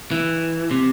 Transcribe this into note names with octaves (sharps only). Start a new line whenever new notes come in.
E3
C3